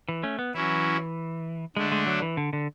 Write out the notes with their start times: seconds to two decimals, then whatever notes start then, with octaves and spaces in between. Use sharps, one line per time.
0.09 E3
0.23 A3 C#4
0.39 B3
0.54 E3 F#3 C#4 E4
1.76 D3 G#3 A3 D4
1.92 G#3
2.07 F#3
2.22 E3
2.37 D3
2.53 D3